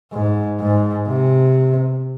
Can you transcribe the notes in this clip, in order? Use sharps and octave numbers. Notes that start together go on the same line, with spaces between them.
G#2
G#2
C3